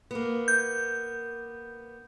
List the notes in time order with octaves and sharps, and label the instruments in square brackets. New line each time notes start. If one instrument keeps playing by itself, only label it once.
[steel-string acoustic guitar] A#3 B3
[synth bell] G6